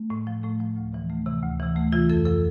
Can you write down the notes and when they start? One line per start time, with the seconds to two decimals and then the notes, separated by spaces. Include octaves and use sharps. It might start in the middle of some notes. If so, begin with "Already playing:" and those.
Already playing: A3
0.10 A2
0.27 F3
0.43 A2 A3
0.60 F3
0.76 D2
0.93 C3 E3
1.10 D2 A3
1.26 C3 E3
1.42 D2
1.60 C3 E3
1.75 D2 A3
1.92 C3 E3 F4
2.10 F2 A4
2.25 C3 F3 A4